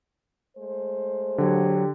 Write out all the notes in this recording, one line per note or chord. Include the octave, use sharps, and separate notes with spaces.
G#3 A3 C5
D3 F#3 G4